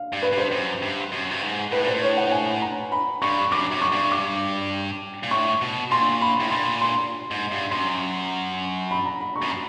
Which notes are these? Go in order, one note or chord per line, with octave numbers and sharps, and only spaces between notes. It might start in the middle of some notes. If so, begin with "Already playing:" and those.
Already playing: F5
G2
B4
G2
C5
F#2
G2
F#2
G2
G#2
A2 B4
A#2 C5
A2
C#5
F#5
G#5
A#5
B5
G2 C#6
F#2 D6
F#2
C#6
G2
D6
A#2
A2 C#6
B2
A#2 C6
B5
A2
A#2 C6
C6
G#2
G2
F#2 C6
B5
A#5
B5
C#6
F#2
C#6